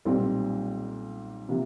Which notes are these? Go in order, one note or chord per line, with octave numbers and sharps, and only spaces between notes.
B1 A#2 G3 C4
C3 F3 A#3